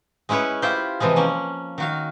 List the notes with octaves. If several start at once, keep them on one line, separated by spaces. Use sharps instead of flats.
G#3 C#4 E4 B4 C#5
E4 F4 G4 C5
C3 E3 F3 G#3
A#3 C#4
D#3 F#4 F5